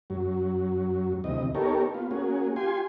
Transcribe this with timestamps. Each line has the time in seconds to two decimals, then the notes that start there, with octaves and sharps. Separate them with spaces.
0.10 F#2 F#3
1.24 D2 C3 E3 D#5
1.55 B3 D#4 G4 A4 A#4 C#5
1.94 B3 F4
2.11 A#3 C#4 F#4 G#4
2.56 F4 G4 G#5 C6